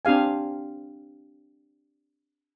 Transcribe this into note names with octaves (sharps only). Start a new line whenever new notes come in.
C4 D4 G4 F5 G#5